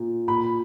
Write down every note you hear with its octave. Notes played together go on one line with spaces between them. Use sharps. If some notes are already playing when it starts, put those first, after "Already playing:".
Already playing: A#2
A#2 B5